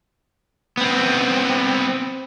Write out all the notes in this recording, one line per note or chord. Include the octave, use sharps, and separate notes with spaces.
B3 C4